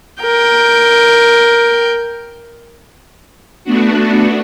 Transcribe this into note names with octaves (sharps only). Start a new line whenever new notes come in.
A#4 G5
A3 B3 D4 F#4